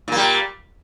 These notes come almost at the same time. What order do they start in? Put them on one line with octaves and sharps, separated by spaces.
A#2 A#3 G3